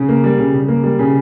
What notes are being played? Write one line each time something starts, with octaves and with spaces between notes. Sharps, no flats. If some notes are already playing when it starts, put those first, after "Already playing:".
Already playing: C#3
A#3
G3
C#3
C#3
A#3
G3
C#3